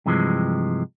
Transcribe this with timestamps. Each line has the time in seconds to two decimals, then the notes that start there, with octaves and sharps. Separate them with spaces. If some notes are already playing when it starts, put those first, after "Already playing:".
0.06 G2 C3 E3 F3 G#3